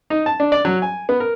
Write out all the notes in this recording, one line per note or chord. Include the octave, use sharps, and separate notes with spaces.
D#4
A5
D4
D5
F#3
G#5
B3
A#4